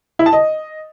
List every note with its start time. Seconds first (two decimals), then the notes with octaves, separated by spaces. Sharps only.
0.19 E4
0.26 A5
0.33 D#5